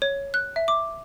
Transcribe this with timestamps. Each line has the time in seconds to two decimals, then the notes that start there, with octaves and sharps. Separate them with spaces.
0.02 C#5
0.34 F#6
0.56 E5
0.68 D6